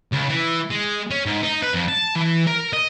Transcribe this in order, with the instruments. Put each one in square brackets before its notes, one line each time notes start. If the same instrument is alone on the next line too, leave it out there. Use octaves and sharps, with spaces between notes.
[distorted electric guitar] C#2
E3
G#3
C#4
G#2
D#4
B4
F2
A5
E3
A#4
D#5